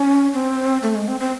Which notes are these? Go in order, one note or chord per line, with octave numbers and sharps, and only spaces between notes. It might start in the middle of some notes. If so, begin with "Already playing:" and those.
Already playing: C#4
C4
A3
G#3
C4
C4